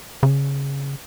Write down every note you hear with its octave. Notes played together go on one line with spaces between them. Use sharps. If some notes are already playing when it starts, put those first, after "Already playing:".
C#3